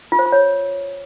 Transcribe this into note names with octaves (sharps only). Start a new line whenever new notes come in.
F4
C5
F4
C#5